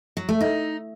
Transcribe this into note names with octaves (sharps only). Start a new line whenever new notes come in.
F#3
A3
D#4